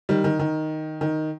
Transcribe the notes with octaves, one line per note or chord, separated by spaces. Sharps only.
D#3 G3
D#3
D#3
D#3